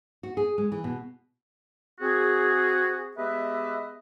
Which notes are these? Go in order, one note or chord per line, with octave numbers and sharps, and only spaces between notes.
F#4
G#4
G#3
E3
B2
C4 F#4 G#4
G#3 B3 G4 B4 D#5 E5